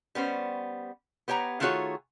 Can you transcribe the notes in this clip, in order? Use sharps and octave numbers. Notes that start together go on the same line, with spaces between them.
G3 B3 C#4 C5
B3 G4 C#5 G5 A#5
D#3 A3 F4 F#4 G#4 C#5